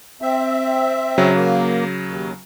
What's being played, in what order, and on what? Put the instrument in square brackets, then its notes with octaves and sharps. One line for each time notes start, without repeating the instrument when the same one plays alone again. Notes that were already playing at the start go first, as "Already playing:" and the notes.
[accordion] C4 E5
[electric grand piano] C#3 F#3
[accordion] A#3
D#2